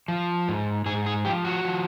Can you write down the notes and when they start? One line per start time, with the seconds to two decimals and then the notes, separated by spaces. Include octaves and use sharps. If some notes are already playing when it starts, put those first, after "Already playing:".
0.08 F3
0.48 G#2
0.86 G#2 G#4
1.06 G#4
1.25 F3 G4
1.45 F#4
1.65 F3